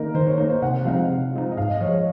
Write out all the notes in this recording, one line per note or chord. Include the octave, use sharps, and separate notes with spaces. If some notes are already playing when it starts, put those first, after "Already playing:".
Already playing: D#3 A#3 D#4 A#4
D#3 C5
C#5
A#3 D#4
C5
C3 F#5
F3 G#3 C4 D#4 F5
C3
F3 G#3 C4 D#4
D#5
G#2 F5
D#5
F3 G#3 C#5